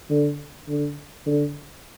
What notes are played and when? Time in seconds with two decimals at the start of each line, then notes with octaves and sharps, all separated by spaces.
0.10 D3
0.68 D3
1.26 D3